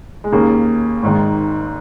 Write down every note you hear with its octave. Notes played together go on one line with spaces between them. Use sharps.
G#3
D#2 C#3 A#3
G#1 G#2 D#3